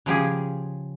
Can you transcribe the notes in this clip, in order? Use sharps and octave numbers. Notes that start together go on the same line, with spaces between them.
C#3 F3 G4 G#4